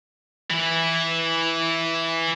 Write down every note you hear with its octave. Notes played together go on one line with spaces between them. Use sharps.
E3 E4